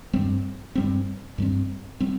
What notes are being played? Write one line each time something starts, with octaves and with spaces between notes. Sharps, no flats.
G2 G3 C4
G2 G3 C4
G2 G3 C4
G3 C4